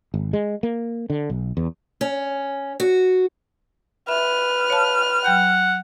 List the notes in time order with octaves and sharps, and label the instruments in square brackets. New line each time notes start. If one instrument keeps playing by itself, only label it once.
[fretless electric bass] G#1
G#3
A#3
D3
B1
E2
[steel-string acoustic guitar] C#4
F#4
[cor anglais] B4 [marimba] E5 [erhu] F6
[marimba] C#5 F5 A5
[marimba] F#3 G5 G6 [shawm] F#5